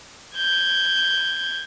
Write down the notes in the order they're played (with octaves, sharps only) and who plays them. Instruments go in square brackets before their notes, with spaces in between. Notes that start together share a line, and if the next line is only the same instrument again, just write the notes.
[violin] G6 G#6